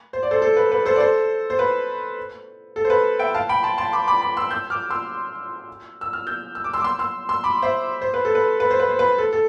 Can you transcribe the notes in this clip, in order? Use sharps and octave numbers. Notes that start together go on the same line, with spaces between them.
C5
D5
A4 C5
A4 C5
B4
B4
A4 C5
D5
A4 C5
C5
B4
A4
C5
B4
E5 G5
F5 A5
G5 B5
A5 C6
A5 C6
B5 D6
B5 D6
B5 D6
C6 E6
E6 G6
D6 F6
C6 E6
E6
F6
E6 G6
E6
D6
C6 E6
D6
C6 E6
C6 E6
C6 E6
B5 D6
C5 E5
C5
B4
A4
B4
B4
C5
B4
C5
B4
A4
A4